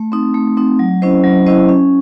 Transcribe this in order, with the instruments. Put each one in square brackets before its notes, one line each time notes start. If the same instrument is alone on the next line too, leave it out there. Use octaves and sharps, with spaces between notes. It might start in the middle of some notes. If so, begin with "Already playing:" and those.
Already playing: [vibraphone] A3
C4 D#4
A3
C4 D#4
F#3
C#4 E4 C5 D#5
F#3
C#4 E4 C5 D#5
C#4